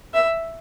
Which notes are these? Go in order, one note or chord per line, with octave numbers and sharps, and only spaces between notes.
E5